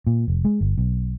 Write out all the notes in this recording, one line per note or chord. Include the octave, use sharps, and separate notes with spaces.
A#2
F1
G#3
G1
B1